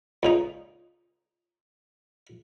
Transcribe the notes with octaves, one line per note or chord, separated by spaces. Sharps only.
C#2 A#2 D#4